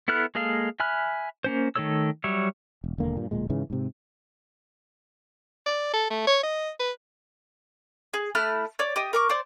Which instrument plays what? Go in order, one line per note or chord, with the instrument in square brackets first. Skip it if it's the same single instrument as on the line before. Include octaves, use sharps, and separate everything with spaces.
[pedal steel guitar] B3 E4 A4 F6 F#6
G#3 A#3 G#4 A4 F5
E5 G#5 B5 F6 F#6
A#3 C#4 C5
D#3 A3 A4 C#5 E6
F#3 G3 C#5 E5
[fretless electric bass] E1
E1 D#2 D3 A#3
G2 A#2
D1 A#2 G#3
G#2 C#3 E3
G#2 C3
[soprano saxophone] D5
A4
A3
C#5
D#5
B4
[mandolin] G#4
A3 E4 F6 F#6
C#5 D5
G4 D#5
A#4 C#6 D6
C5 D5